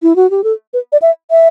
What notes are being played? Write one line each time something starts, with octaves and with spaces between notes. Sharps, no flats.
E4
F#4
G4
A4
B4
D5
E5
E5